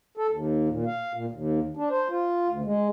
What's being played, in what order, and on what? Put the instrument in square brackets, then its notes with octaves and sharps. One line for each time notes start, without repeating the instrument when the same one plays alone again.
[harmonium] A4
D#2
A#2
F5
A#2
D#2
D4
C5
F4
D2
G#3